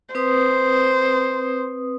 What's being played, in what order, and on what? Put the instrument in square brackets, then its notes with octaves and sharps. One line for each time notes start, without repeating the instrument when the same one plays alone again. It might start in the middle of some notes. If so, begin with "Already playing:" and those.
[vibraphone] C4 B4 D#6 [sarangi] C5